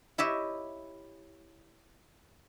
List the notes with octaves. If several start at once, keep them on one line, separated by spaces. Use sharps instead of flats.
E4 G4 C#5 D#5 E5